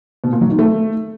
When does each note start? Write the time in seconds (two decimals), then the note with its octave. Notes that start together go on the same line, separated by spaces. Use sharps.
0.24 B2
0.32 A#2
0.41 F#3
0.50 D#3
0.59 A3